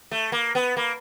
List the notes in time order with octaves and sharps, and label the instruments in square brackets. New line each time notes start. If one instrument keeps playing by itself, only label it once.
[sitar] A3
A#3
B3
A#3